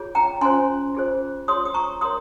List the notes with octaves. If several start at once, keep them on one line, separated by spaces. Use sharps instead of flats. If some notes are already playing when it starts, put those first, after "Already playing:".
Already playing: F4 G#4 C#5
G5 A#5
C#4 F4 C5 G#5 C6
F4 G#4 C5
F4 G#4 C#5 C6 D#6
D#6
A#5 C#6
G4 A#4 C#5 C6 D#6